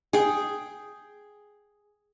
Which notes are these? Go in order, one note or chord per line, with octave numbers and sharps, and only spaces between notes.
G#4 G5